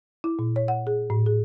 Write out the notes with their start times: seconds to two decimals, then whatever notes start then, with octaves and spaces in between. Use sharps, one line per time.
0.24 E4
0.39 A#2
0.56 C#5
0.68 F#5
0.87 G#4
1.10 A2
1.26 G#4